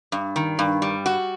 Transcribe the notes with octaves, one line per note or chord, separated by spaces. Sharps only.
G2
D#3
G2
G3
F#4